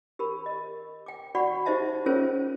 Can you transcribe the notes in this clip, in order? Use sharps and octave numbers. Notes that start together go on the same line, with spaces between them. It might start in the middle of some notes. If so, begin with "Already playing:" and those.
G4 A#4 B5
D#5
G5 D6
F#4 D5 F#5 B5 C#6
D#4 G4 C5 D#5 E5 A5
C#4 F4 G#4 A#4 C5 C#5